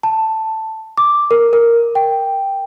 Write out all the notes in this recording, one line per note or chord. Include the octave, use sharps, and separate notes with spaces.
A5
D6
A#4
A#4
G5